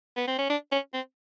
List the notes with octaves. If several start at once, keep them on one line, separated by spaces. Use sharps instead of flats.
B3
C4
C#4
D4
C#4
C4